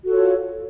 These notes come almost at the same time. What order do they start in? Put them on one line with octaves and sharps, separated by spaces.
F#4 A4 F4 C#5